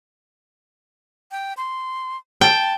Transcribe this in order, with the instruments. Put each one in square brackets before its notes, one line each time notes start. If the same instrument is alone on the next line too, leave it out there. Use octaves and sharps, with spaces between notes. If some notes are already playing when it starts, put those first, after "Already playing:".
[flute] G5
C6
[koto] G5 [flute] A5